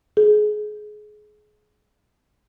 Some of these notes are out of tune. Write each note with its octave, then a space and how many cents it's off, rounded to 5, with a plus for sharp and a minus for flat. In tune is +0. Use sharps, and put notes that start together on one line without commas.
G#4 +25